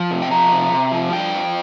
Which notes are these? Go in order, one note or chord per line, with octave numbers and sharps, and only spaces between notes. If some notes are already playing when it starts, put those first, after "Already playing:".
Already playing: F3
C3
G5
F3 A#5
C3
C3
F3
G2 G5
F3